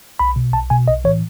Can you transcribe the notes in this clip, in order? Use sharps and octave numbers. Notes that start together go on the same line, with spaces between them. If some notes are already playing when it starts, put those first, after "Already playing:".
B1 B5
B2
B1 A5
B2 G#5
B1 D#5
A2 E3 C#5